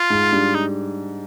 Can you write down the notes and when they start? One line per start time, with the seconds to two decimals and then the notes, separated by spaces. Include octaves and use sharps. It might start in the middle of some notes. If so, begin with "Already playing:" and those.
Already playing: F4
0.10 G#2
0.32 G3 D4
0.55 D#4